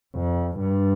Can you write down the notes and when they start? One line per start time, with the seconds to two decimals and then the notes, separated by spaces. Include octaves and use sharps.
0.15 F2
0.59 G2